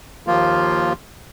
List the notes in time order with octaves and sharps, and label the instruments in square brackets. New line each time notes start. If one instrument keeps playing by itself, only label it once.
[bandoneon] D#2 F3 A#3 F4